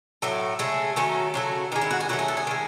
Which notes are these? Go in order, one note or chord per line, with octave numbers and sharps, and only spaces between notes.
A2 F#3 A3
C#3 G#3 A3
D#3 F#3 A3 C#4
C#3 F#3 A3
D#3 G#3 D#4
E4
F#4
G#4
D#3 F#3 A3 F#4
G#4
A4
G#4
D#3 G#3